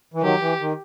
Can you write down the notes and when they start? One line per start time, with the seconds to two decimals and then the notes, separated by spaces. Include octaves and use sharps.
0.14 E3
0.21 D#3 F#3 G4
0.40 E3
0.60 D#3